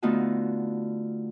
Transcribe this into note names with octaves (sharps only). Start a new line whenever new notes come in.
D3 A3 B3 D#4 F4 F#4